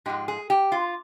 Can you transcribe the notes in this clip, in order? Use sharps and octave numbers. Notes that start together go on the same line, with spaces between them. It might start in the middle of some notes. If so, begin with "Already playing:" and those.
G#2 F3 G#3 G4
G#4
G4
F4